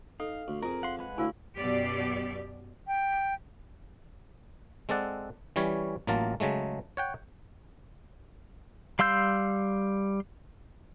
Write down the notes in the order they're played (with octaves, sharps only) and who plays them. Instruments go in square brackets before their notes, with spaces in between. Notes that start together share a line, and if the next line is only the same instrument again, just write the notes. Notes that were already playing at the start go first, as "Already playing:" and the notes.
[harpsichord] D#4 [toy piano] A4 [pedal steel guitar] F5
[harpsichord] D2
[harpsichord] F2 G#4 [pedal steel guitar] A#4
[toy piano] F5 [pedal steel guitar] F#5 C6
[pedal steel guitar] G#3 B4 F#5
[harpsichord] D2 [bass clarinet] E4 [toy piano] C#5 F5 G#5
[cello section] F#2 B2 G4 D5
[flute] G5
[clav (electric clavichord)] G#3 C4 A4 D5 F#5
E3 G3 C#4 C#5
A1 F#3 A#3 F4 A5
C#3 F#3 G#3 A3
C#5 F#5 G5
[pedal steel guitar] G3 F5 C6 E6 G6